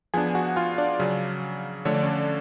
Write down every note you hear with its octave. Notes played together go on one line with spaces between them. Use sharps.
F3 B3 D4 G#4 G#5
F#4 F#5
F4 F5
D4 D5
C#3 F#3 C#4
D3 F3 A3 D4 C#5
D5
C#4 C#5